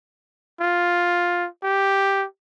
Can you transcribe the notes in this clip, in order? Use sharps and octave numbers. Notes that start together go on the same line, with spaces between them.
F4
G4